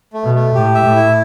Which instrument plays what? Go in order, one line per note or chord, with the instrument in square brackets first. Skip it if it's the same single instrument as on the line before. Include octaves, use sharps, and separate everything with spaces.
[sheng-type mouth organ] A3
[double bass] B2
[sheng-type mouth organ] A3
[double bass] A2 [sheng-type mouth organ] G4
[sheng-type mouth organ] E5
[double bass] A2
[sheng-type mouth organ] E4